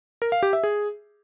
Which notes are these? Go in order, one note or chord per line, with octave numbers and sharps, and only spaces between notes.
A#4
F5
G4
E5
G#4